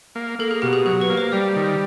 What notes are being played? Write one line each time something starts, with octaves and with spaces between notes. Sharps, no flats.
A#3
A#3 A4
G#4
B2 G4
G#4
F#3 G#4
B4
A#3
C5
G3 D5
D#3